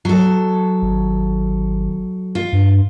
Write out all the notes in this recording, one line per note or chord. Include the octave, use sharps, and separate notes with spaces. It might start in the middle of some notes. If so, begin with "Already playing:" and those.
F#3 A4
G#1
F4
G2